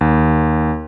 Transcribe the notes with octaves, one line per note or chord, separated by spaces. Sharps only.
D#2